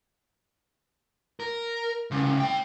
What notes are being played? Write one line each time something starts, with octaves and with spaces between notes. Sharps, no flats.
A#4
C2 C#3
C#5 G5